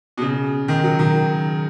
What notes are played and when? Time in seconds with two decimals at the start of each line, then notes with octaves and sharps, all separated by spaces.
0.18 B2
0.22 C#3
0.68 D#3
0.84 F#3
0.99 D#3